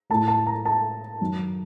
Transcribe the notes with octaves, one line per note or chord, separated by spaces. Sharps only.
A2 A3 A5
A5
A#5
A5
F#2 D#3 F#3